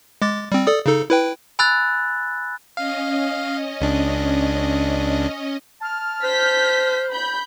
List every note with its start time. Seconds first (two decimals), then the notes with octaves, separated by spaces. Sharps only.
0.22 G#3 D6 A6
0.52 G3 C4
0.67 A4 D5 D#6
0.86 C#3 D#4 A4
1.10 E4 B4 G5
1.59 G#5 B5 E6 F#6 A6
2.77 C#4 D#5 F5
3.81 C#2 D4
5.82 A5 F6
6.24 C5 G6 B6
7.11 B5 G6